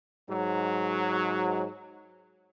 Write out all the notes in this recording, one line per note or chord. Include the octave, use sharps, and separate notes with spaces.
G#2 F#3